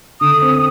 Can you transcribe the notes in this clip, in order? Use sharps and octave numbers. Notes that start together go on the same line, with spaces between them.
D3 D#6
C4